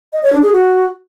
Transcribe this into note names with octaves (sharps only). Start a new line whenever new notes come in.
D#5
C#5
D4
G#4
F#4